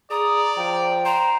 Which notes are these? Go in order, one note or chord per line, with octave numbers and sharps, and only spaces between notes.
G#4 D5 A#5 D#6
F3 G5
C5 A#5